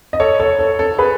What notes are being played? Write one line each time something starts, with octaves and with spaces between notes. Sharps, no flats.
D#5
A4 C#5
A4 C#5
A4
A4
G#4 B4